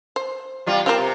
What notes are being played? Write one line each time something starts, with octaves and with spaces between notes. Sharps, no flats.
C5
C3 G3 F4
C4 F4 G4 A#4
C3